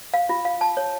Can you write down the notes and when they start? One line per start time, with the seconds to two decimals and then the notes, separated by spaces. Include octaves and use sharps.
0.14 F5
0.29 F4
0.45 F5
0.61 A5
0.77 C#5